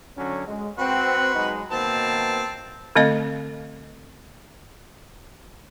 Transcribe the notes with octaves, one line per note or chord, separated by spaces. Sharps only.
D3 F#3 C#4
G#3
C4 F#4 B4 F#5
F#3 G#3 D#4
B2 D#3 A#3 C4 A5
D3 A3 C4 D#5 F5